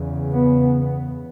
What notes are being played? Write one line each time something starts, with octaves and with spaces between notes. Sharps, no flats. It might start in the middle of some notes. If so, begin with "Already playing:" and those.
Already playing: E2 C#3
B3
B3